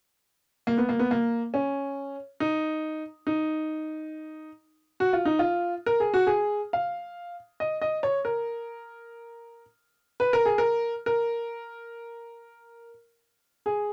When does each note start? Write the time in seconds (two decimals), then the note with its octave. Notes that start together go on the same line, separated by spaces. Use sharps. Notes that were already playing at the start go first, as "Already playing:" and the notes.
0.67 A#3
0.78 B3
0.89 A#3
0.99 B3
1.11 A#3
1.54 C#4
2.40 D#4
3.27 D#4
5.00 F#4
5.13 F4
5.25 D#4
5.39 F4
5.86 A#4
6.00 G#4
6.14 F#4
6.27 G#4
6.73 F5
7.60 D#5
7.82 D#5
8.03 C#5
8.25 A#4
10.20 B4
10.33 A#4
10.45 G#4
10.58 A#4
11.06 A#4
13.66 G#4